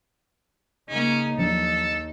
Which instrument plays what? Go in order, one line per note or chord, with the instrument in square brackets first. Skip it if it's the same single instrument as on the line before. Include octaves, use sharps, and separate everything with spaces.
[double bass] C#3 A#3 [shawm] C#4 [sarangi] D#4
[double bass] D#2 [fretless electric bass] F3 F#3 D4 [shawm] A4